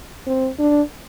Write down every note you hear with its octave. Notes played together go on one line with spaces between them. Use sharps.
C4
D4